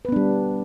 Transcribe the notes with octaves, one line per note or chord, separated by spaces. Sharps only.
G3 B3 D4 B4